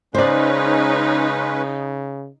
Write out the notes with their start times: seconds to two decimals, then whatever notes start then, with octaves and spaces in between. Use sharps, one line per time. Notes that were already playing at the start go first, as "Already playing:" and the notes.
0.15 C#3 G#3 C#4 D#4 B4 C5 D5